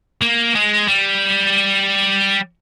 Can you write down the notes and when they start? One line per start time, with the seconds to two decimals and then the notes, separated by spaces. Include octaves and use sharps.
0.21 A#3
0.55 G#3
0.88 G3